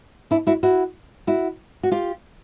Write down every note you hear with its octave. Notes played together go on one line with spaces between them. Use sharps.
D4 E4
E4 F#4
E4 F#4
E4 F#4
F#4
F4 G4